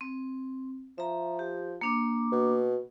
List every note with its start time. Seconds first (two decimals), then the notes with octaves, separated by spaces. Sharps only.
0.01 C4
0.98 F3 E5 A#5
1.39 G4
1.81 A#3 D4 D6
2.32 B2